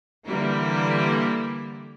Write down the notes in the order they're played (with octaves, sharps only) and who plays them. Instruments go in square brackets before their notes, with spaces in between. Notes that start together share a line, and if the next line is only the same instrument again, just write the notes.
[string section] D3 E3 G3 A#3 E4